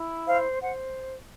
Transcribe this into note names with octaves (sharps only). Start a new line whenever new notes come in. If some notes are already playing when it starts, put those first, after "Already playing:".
Already playing: E4
C5 F5
C5 F#5